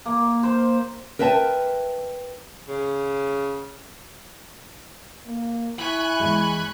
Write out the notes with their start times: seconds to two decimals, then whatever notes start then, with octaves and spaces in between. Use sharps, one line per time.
0.05 A#3
0.43 C5
1.19 A#4 B4 E5 G5 A5
2.68 C#3
5.26 A#3
5.79 E4 G#5 B5 C#6 F#6
6.20 E2 G#3